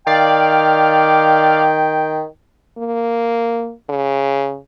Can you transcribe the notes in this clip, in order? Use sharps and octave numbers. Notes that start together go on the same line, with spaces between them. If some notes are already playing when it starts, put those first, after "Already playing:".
D#3 D5 F5 G5
A#3
C#3